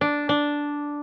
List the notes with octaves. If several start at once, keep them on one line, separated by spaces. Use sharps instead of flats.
D4
D4